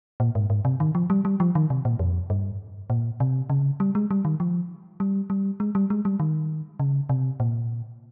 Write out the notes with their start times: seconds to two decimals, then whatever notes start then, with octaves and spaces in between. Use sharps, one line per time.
0.20 A#2
0.35 G#2
0.50 G#2
0.65 C3
0.80 D#3
0.95 F3
1.10 G3
1.25 G3
1.40 F3
1.55 D#3
1.70 C3
1.85 A#2
1.99 F2
2.30 G2
2.90 A#2
3.20 C3
3.50 C#3
3.80 G3
3.95 G#3
4.11 G3
4.25 D#3
4.40 F3
5.00 G3
5.30 G3
5.60 G#3
5.75 G3
5.90 G#3
6.05 G3
6.20 D#3
6.80 C#3
7.09 C3
7.40 A#2